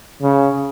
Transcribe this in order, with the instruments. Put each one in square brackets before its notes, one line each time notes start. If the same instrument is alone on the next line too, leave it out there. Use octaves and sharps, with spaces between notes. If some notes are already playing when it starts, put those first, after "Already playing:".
[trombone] C#3